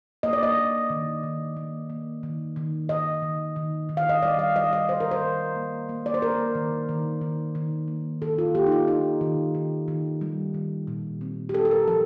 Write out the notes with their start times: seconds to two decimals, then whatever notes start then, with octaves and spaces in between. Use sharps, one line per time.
0.23 A#3 D#5
0.33 D5
0.43 D#5
0.57 A#3
0.90 D#3
1.23 D#3
1.57 A#3
1.90 A#3
2.23 D#3
2.56 D#3
2.89 D#3 D#5
3.22 D#3
3.56 D#3
3.89 D#3
3.97 F5
4.09 D#5
4.23 G3 D5
4.39 F5
4.56 G3 D#5
4.73 D#5
4.89 D#3 C5
5.00 A#4
5.11 C5
5.22 D#3
5.56 A#3
5.89 A#3
6.06 D5
6.14 C5
6.22 A#3 A#4
6.55 D#3
6.89 D#3
7.21 D#3
7.55 D#3
7.88 A#3
8.22 D#3 A4
8.38 F4
8.55 A#3 G4
8.67 D#4
8.72 F4
8.88 D#3 D#4
9.21 D#3
9.55 D#3
9.88 D#3
10.21 G3
10.54 D#3
10.87 A#2
11.21 C4
11.49 G4
11.54 C4 A4
11.65 A4
11.71 A#4
11.88 F3 A4